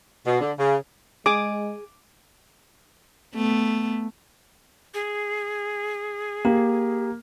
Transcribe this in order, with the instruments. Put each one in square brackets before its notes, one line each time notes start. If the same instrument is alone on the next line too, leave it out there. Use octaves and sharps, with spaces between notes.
[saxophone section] B2
D3
C#3
[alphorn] G#3 [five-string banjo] G#4 [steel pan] D6
[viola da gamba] A3 B3
[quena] G#4
[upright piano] A#3 [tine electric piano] G4